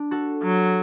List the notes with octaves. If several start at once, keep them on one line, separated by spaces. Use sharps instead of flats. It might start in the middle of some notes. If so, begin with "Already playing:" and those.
Already playing: D4
F#4 A4
F#3